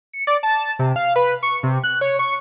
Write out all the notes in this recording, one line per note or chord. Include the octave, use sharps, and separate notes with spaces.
C#7
D5
A5
C3
F5
B4
C#6
C3
F#6
C#5
C#6